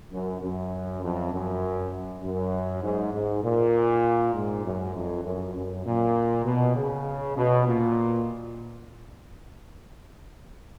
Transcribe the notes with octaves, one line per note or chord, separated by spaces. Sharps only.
F#2
F#2
F2
F#2
F#2
G#2
G#2
A#2
G#2
F#2
F2
F#2
F#2
A#2
B2
C#3
B2
A#2